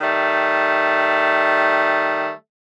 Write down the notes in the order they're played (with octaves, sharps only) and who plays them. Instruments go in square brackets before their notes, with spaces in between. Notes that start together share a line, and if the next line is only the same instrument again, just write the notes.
[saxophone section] D#3 G3 A3